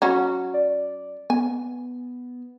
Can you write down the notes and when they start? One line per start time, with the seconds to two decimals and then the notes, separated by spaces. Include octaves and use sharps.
0.02 F#3 C#4 F#4
0.54 D5
1.30 B3 G#5